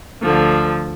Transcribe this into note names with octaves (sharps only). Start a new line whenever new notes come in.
D2 D3 F3